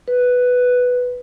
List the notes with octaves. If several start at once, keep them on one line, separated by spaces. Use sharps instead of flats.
B4